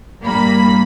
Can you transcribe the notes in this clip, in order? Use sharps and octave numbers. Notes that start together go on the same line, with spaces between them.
G2 A#2 G3 A#3 B5